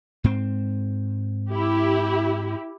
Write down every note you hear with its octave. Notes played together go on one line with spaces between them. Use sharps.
G#2 C4
E4 G4